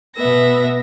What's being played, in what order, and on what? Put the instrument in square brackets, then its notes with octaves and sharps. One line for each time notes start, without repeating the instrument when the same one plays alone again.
[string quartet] B2 B3 E5 A#6